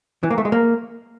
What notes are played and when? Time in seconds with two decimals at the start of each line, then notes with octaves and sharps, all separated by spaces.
0.23 E3
0.31 A#3
0.38 A3
0.45 G#3
0.52 A#3